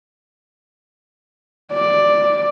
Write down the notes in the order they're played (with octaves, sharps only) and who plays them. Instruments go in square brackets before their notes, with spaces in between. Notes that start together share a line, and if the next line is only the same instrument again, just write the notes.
[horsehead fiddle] D5